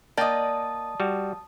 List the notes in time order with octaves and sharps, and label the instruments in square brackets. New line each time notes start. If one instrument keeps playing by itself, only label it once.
[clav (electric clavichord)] A#3 G5 [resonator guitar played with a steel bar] D5 D#5 [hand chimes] A5 D#6
[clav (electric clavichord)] G3 F#4